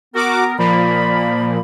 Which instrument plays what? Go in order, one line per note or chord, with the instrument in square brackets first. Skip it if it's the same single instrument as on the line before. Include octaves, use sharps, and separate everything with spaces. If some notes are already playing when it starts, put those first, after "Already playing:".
[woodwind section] B3 A#4 [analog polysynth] F#4 D6
[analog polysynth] A#2 F3 A#3 [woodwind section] D5 B5